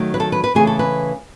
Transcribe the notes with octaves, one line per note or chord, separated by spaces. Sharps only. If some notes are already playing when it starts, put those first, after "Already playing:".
Already playing: D#3 F#3 A3
B4
A4
B4
B4
C#3 E3 A3 G#4
A4
B4